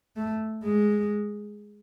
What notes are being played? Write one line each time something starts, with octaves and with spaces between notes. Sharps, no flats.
A3
G#3